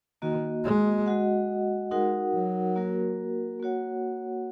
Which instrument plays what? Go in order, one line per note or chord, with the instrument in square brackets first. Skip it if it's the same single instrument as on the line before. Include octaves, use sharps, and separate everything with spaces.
[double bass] D#3 [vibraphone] A#3 F#4 D#5
[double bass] G#3
[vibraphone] G#3 F#4 D#5 F#5
[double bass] G#3 [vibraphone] D#4 F#4 A#4 F#5
[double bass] F#3
[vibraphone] A#3 F#4 A#4
A#3 F#4 C#5 F#5